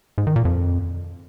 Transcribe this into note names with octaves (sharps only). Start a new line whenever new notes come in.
G#2
D#3
A#2
F2